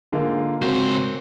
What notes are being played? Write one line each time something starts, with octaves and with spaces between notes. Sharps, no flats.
G#2 D3 A#3 F4
C#2 F#2 C4 F#4 C5